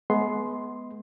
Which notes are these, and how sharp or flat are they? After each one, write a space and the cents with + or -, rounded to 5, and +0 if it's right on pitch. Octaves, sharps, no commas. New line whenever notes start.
G#3 +35 B3 +0 C6 +0